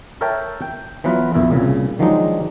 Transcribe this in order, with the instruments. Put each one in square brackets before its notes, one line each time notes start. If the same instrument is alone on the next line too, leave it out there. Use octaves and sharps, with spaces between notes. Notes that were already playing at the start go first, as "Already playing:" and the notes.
[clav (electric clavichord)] A4 A#4 C#5 E5 G5 A5
G5
E3 F#3 B3 F4 B4
A#1 E2 A#3 E4
C2 A#2 C#3
D#3 F3 F#3 G#3 D4 D#4